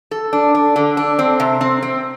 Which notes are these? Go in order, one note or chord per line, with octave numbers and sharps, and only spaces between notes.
A4
D4
D4
D3
D4
C4
C3
C4
C4